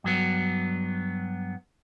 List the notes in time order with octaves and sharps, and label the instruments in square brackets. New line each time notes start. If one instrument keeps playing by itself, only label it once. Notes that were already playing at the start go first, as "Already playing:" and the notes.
[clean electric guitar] G2 F#3 B3